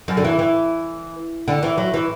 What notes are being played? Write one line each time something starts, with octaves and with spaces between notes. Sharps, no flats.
F#2
D3
E3
E3
D3
E3
F#3
E3